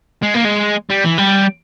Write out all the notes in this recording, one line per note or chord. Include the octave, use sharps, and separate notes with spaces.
G#3
A#3
G#3
G3
E3
G3